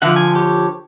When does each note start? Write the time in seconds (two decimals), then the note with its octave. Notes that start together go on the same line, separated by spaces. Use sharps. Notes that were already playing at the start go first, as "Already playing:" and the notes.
0.02 D3 F3 E5 F#5
0.16 G#5
0.35 G4 C#5